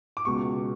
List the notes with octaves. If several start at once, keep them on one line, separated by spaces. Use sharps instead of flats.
D6
C#2 B2 G#3 C#6